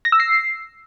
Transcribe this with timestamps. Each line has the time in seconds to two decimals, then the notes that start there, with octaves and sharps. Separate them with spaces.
0.05 A#6
0.12 E6
0.20 C7